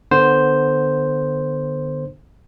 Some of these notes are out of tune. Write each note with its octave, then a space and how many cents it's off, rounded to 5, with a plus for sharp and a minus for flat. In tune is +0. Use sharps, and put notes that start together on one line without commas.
D3 +20 B3 -10 C5 +0